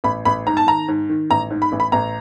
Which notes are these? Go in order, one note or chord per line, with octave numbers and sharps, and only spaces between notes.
A1 B5
A1 B5
G#2 A#5
A5
D#3 A#5
G#2
D#3
A1 A#5
G#2
B5
A1
B5
A1 A#5